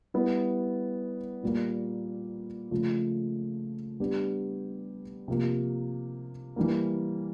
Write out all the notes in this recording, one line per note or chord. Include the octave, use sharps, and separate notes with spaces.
G3 B3 E4
A#2 G3 A#3
C#3 F3 A3
G3 B3 D4 G4
C3 F3 A#3
E3 G3 A#3